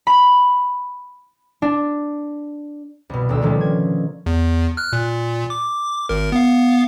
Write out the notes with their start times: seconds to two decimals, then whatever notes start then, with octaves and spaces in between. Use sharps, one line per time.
0.07 B5
1.62 D4
3.10 C2 B2
3.29 D#1 D2 E6
3.42 D3 D#3 F3 G3 A3 C#4
3.61 G#6
4.26 E2
4.77 F6 F#6
4.93 A#2
5.50 D6
6.09 G#1 A#4
6.32 B3 F5